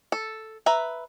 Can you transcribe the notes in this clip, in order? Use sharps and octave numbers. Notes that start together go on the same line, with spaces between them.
A4
B4 E5 A#5